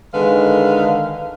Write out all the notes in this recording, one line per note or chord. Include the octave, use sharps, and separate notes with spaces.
D3 D#3 G#3 B4 F5